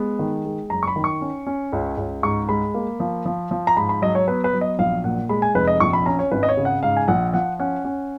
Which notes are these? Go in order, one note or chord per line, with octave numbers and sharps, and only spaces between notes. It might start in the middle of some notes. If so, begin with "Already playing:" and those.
Already playing: G#3 B3
D#3
G#3
F#1 A#5
C#6
B5
D#3
C#6
C#4
C#4
C#2
C#2
G#2 C#6
G#3 B5
A#3
F3
F3
F3
A#5
G#2 B5
B5
F#3 D#5
C#5
B3 B4
B4
F#3
D#5
A#1 F5
A#2 F#5
G#3 B5
G#5
F1 B4
D#5
A#1 C#6
B5
C#4 A#5
C#5
G#1 B4
D#5
C#5
C#3
F#5
G#2 F5
G#5
A#1 F#5
F3 F#5
C#4 F#5
C#4